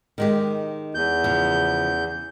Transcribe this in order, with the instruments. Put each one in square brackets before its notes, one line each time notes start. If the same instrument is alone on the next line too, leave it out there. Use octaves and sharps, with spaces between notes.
[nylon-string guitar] D#3 G#3 G4
[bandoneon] E2 G6
[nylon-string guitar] C#3 F3